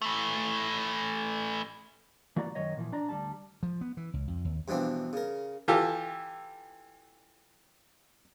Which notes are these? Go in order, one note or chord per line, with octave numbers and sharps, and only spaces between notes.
E3 A3
E3 A#3 F#4 D5 A#5
F#2 D#3 F#3 C#5 D#5
A#2 E3 F3
D4 D5 A#5
D2 G#2 G3 A5
F3
B3
E3
C#2
F2
D#2
G2 B2 E3 F3 C4 D4
C#3 A#4
E3 F4 G4 A4